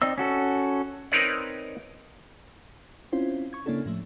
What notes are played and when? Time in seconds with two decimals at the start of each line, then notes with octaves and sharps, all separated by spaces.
0.02 C4 D#4 D5 D#5 E6
0.18 C#4 F#4 A4
1.12 C4 D#4 A#4 B4 C#5 D5
3.12 C4 C#4 E4 F4 C5
3.53 C#6 G#6
3.66 C#3 A#3 C#4 D4 E4 A4
3.86 A2 F3 A3